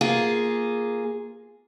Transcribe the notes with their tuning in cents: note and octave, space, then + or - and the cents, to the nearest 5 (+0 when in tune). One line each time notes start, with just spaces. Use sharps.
A#3 +0 F4 +0 G#4 +0